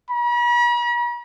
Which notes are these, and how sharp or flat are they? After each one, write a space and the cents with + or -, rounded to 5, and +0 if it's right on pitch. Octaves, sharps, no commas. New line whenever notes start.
B5 -45